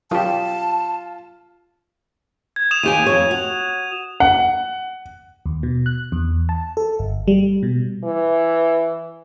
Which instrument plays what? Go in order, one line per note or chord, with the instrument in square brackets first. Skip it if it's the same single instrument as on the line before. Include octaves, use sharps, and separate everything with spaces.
[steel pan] F#3 G4 [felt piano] F4 [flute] A5
[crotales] G#6
D#6 E7 F7
[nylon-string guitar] D#2 G4 G#5 [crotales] D#7 F7
[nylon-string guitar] F2 C#5
F#4
[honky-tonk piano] F#5
[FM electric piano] D#2
B2
F#6
E2
A5
A4
G1
G3
B2
[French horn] E3